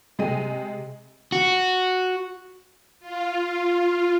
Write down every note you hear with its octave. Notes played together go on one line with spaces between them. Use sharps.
C3 G#3 G4 G#4 D#5 D#7
F#4
F4